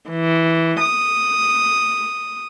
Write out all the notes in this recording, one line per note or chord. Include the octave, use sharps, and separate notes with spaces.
E3
D#6